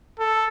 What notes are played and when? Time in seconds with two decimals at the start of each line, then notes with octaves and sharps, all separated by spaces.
0.19 A4